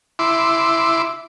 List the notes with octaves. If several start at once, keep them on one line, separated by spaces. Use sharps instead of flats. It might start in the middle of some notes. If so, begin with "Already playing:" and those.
E4 C6 D6